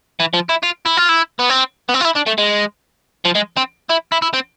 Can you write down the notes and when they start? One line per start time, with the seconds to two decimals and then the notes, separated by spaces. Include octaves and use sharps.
0.20 E3
0.34 F3
0.49 E4
0.63 F4
0.86 E4
0.97 F4
1.09 E4
1.39 B3
1.50 C4
1.89 B3
1.94 C4
2.00 F4
2.05 E4
2.15 D4
2.26 A3
2.38 G#3
3.25 F3
3.35 G#3
3.57 C4
3.89 E4
4.12 E4
4.22 E4
4.34 C4